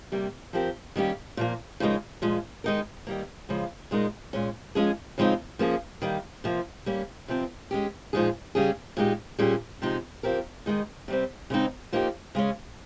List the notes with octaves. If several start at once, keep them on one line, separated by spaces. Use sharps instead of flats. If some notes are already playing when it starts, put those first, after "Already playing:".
C3 G3 A#3
F3 C4 G4 A#4
D#3 G3 A#3 C#4 G4
A#2 F3 A#3
C#3 F3 G#3 D#4 A#4
A#2 F3 G#3
D#3 G#3 D#4 A#4
D#3 G3 A#3
C#3 F3 G#3
A#2 G#3 D#4 A#4
A#2 G#3 C#4
F3 G#3 C#4 G#4
C#3 F3 G#3 C4 D#4
F3 A#3 C#4 G#4
D#3 G3 A#3
C3 F3 A#3
G3 A#3 C#4
C3 F3 C4
G#3 C#4 G4
A#2 F3 G#3 D#4 G#4
C#3 G3 C#4 G#4
A#2 G#3 D#4 G4
A#2 G3 C#4 G#4
C3 F3 G#3 D#4
F3 C4 G4 A#4
D#3 G#3 D#4
C3 G3 C4
C#3 G#3 C4 D#4
F3 A#3 D#4 G4
C#3 G#3 C#4